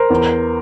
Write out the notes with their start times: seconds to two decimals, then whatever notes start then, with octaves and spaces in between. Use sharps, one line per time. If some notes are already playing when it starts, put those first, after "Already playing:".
Already playing: A#4 C5
0.10 E2